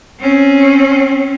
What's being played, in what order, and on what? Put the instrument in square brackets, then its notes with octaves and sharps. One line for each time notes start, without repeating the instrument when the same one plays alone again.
[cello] C4 C#4